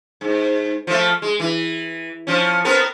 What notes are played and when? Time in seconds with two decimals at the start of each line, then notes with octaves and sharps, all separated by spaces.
0.21 G#2
0.87 F3 A3
1.22 G#3
1.40 E3
2.27 F3 C#4
2.65 B3 C4 A#4